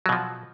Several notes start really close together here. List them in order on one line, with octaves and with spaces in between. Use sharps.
F#3 B2 F3